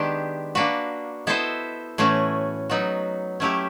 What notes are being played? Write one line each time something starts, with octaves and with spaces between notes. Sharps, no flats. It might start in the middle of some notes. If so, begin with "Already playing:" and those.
Already playing: D#3 G#3 B3 D4 G4
A#3 D4 F#4 B4
B3 E4 A4 C5 D#5
A2 E3 A3 C#4 F#4
F#3 B3 D#4 F#4
F#3 A3 C#4 E4 G4